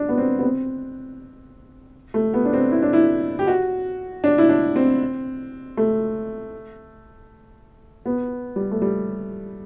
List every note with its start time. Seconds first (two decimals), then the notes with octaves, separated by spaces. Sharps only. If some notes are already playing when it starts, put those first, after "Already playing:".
Already playing: D4
0.09 B3
0.18 C4
0.39 B3
0.42 C4
2.14 A3
2.34 B3
2.45 D4
2.53 C4
2.72 E4
2.82 D4
2.93 E4
3.39 G4
3.47 F#4
4.24 D4
4.38 E4
4.49 D4
4.76 C4
5.77 A3
8.06 B3
8.56 G3
8.71 A3
8.82 G3